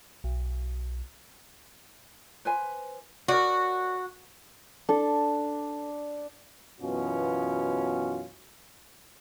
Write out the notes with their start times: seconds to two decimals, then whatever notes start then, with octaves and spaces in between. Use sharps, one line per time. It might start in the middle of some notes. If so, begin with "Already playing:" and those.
0.24 B1
2.45 B4 C5 G#5
3.28 F#4 A#4 C#5 D5
4.89 D4 A4
6.81 F#2 B2 E3 B3 C#4 F4